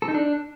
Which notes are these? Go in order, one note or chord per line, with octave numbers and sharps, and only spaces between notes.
A4
D#4
D4